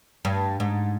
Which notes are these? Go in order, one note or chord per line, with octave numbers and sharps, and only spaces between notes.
G2
G#2